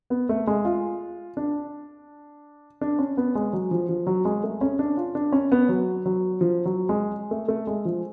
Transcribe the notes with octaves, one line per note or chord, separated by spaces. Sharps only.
B3
A3
G#3
F4
D4
D4
C#4
B3
G#3
F#3
F3
F3
F#3
G#3
A3
C#4
D4
F4
D4
C#4
B3
F#3
F#3
F3
F#3
G#3
A3
A3
G#3
F3